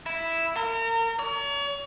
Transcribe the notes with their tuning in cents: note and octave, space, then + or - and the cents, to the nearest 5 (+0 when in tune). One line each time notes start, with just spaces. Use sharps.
E4 +0
A#4 -35
C#5 +40